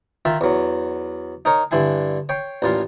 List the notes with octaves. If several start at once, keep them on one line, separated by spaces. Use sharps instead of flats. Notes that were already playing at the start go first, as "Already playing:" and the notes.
D#3 F4 E5
E2 F#3
D#4 A#4 C#5
G2 D3 E4 G#5 C6
C#5 G5 C6
A1 A#2 F4 C6